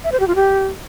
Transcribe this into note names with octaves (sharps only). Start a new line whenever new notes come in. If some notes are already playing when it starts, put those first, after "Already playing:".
E5
C5
G4
F4
G4